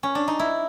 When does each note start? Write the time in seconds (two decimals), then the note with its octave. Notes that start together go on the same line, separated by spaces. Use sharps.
0.03 C#4
0.15 D4
0.28 D#4
0.39 E4